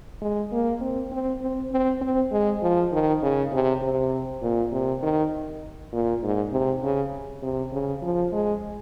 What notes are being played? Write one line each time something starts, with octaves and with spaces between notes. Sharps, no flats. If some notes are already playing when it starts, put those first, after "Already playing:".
G#3
A#3
C4
C4
C4
C4
C4
G#3
F3
D#3
C#3
C3
C3
A#2
C3
D#3
A#2
G#2
C3
C#3
C3
C#3
F3
G#3